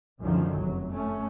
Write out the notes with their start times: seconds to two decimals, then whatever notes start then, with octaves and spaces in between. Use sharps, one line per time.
0.21 C#2 F#2 D3 D#3 F3
0.56 F1 F#3
0.91 A3 C#4